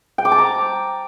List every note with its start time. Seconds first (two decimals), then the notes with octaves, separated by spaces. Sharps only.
0.18 G5
0.25 D6
0.32 A5
0.38 A#5